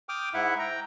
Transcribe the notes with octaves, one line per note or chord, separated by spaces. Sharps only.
G5 D6 D#6 F6
G#2 E4 E5 F#5
G5 A#5